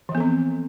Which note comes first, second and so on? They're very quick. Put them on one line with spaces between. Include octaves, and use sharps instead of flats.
E3 F3 B3 A4 C4